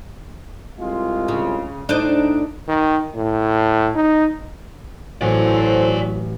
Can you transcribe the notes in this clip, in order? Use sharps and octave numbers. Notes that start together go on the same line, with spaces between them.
C2 G#3 F4
C#3
A2 D4 D#4 C5 D#5
D#3
A2
D#4
A1 F#3 F#4 A4 C5 D5 G#5